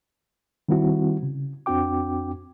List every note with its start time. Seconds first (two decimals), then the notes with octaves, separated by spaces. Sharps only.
0.69 D#3 G3 C4 E4 F#4
1.23 C#3
1.66 F2 C4 D4 F#4 G5 D6